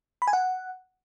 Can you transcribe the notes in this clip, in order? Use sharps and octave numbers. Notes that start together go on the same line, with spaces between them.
B5
G#5
F#5